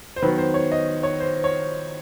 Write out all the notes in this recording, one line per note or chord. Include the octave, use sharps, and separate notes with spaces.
C5
D#3 F#3 B3 B4
C5
C#5
D#5
C#5
C5
C#5